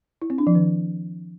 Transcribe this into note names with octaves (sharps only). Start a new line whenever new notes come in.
E4
C4
D4
F3
D#3